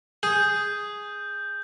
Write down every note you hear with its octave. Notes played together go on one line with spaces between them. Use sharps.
G#4 G6